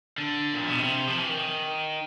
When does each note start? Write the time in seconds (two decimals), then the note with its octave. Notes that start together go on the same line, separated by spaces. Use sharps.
0.18 D3
0.54 A#2
0.67 B2
0.78 C3
1.08 F3
1.18 E3
1.29 D#3